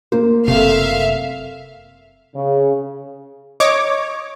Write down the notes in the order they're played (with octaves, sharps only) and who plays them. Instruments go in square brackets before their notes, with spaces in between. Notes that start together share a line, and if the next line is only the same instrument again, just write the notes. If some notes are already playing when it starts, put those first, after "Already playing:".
[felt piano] A#3 [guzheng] C5
[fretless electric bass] F#1 C3 [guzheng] A3 F4 [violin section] E5 F5
[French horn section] C#3
[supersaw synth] C#5 D6 [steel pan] D#5